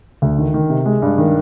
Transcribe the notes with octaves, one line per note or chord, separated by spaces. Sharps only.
D2
D#3
D#3
C3
G#3
G2
D#3